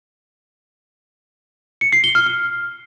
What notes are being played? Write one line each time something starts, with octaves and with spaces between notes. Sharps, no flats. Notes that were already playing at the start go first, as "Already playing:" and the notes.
C#7
C7
G7
F6
F6